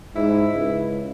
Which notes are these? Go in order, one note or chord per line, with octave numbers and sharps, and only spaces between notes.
G#2 E4
C#2